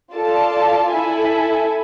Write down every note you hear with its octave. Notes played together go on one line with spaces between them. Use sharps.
F4 A4 D5 A5
E4 A4 E5 G#5